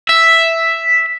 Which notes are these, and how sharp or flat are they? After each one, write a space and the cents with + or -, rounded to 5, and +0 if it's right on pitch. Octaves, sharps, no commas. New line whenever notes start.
E5 +0